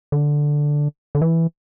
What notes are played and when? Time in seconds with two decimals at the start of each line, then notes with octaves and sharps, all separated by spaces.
0.12 D3
1.15 D3
1.22 E3